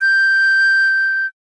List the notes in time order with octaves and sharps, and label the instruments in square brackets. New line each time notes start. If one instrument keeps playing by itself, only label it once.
[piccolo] G6